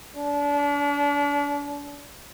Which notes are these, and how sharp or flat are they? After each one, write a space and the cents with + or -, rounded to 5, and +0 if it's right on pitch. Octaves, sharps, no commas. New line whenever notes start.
D4 -35